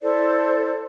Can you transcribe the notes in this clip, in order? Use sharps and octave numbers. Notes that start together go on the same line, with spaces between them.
E4 A4 C5 D5